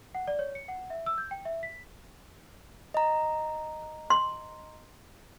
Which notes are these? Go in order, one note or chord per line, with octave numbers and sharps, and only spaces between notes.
F#5
D5
C#5
C#7
F#5
E5
E6
G6
G5
E5
B6
D#5 A#5
C6